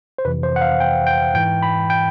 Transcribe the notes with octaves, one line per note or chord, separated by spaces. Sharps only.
C5
F2 C3 E3 B4
C5
F#5
F5
G5
G5
G#2 E3 G5
B5
G5